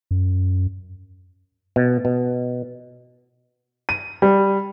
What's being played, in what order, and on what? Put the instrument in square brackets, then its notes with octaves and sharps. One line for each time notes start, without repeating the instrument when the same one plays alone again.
[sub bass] F#2
[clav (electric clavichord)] B2
B2
[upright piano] D#7
G3